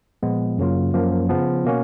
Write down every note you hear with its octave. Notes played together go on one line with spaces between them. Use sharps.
A#2 F3 G#3 B3
F#2 C#3 F#3 A#3 F4
F#2 F3 A#3
C#3 F3 B3
B2 A#3 C#4 F#4